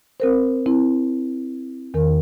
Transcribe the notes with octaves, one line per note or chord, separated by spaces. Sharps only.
C4 A#4 C5
C4 E4
E2 D#3 A#4